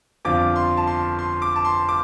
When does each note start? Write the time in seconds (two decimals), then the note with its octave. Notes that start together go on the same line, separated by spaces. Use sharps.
0.25 G1 F2 F3 D4 F4 D6
0.56 C6
0.77 A5
0.87 C6
1.19 C6
1.42 D6
1.56 A5
1.65 C6
1.89 D6